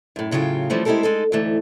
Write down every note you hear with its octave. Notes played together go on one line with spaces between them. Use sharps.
F#2 A2
A2 C#3 F#3 F4 G5
E3 F3 G3 A3 C#4
G#3 C4 E4 G4 A4 A#4
G#3 D#4 A4
D2 G#2 E3 A3